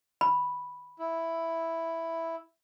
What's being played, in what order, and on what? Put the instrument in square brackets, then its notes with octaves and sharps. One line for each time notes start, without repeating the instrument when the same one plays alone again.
[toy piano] B5
[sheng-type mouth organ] E4